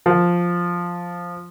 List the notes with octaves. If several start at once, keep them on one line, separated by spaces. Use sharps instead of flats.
F3